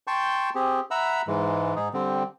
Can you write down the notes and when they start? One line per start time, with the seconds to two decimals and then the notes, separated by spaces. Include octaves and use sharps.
0.07 G5 A5 C6 C#6 G6
0.55 C4 G4 G#4
0.91 E5 F#5 A#5 B5 E6
1.27 G#2 E3 G#3
1.76 G#2 D#4 G#4
1.93 D3 G3 C4